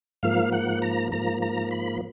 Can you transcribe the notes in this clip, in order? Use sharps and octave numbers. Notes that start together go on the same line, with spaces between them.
G#2 F3 A#3 F5
F#5
A#5
G#2 F3 A#3 A#5
A#5
B5